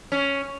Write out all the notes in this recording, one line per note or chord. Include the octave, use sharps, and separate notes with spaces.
C#4